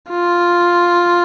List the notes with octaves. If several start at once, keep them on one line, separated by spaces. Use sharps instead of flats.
F4